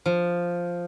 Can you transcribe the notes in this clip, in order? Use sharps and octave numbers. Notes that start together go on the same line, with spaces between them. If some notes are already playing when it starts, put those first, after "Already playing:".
F3